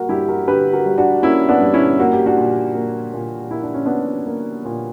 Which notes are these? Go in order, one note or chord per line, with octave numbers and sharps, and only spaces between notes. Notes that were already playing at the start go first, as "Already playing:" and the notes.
Already playing: G3 A#3 F#4 A#4
G2 E4 G4
F#4 A#4
D3 G4 B4
F#4 A#4
G3
D4 F#4
A#3 C#4 E4
B3 D4
G2
C#4 E4
A#3 F#4
G4
D4 F#4
A#2
A#3
A#2
A#3 E4
D4
C#4
A#2 B3 D4
A#3
A#2